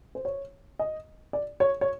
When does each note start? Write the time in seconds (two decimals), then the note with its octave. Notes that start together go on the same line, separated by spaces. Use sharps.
0.15 C5
0.25 C#5
0.79 D#5
1.33 D5
1.60 C#5
1.81 C#5